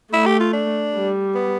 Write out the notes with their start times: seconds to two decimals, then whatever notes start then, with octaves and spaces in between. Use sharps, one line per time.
0.13 A3 E4
0.26 G4
0.40 F4
0.53 D4
0.94 G3
1.35 B3